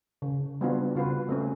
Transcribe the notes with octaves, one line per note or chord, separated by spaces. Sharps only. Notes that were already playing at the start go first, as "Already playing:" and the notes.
C#3
G3 B3 C4 D4 F4 F#4
C#3 F4 F#4 B4
A3 C4 C#4